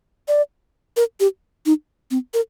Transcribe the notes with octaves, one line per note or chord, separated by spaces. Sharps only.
D5
A#4
G4
D#4
C4
A#4